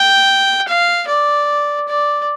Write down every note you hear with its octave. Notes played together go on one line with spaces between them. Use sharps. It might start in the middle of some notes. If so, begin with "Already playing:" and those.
Already playing: G5
F5
D5
D5